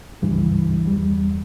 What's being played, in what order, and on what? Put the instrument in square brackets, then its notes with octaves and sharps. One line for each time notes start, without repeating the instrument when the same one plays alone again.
[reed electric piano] C#2 G2 E3
E2 G3